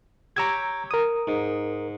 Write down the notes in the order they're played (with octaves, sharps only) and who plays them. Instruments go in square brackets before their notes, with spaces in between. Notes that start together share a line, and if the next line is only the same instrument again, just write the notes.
[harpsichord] G4 C#5 G5 [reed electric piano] A#5 E6 G#6
[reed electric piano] A#4 D#6
[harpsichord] G#2